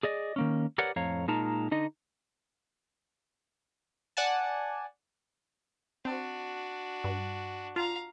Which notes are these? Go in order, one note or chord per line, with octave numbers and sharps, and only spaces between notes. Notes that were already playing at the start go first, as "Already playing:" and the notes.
G#4 D5 D#5
D#3 A#3 C#4
G4 A#4 B4 C#5 D5 F#5
F2 A2 C#5 F5 A#5
A#2 G#3 D#4 A#4 A5 A#5
D3 D#4 D#5
D5 F#5 G#5 A5
C4 D4 F#4
G2
F4 F5 A#5